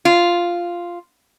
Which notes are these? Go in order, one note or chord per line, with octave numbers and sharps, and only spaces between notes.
F4